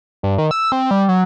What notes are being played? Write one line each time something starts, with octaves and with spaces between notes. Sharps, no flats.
G2
D#3
E6
C4
G3
F#3